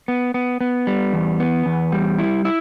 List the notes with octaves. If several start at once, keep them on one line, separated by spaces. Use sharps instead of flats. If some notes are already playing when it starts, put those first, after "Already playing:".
B3
B3
B3
G3
E2
B3
E2
G3
E4
E4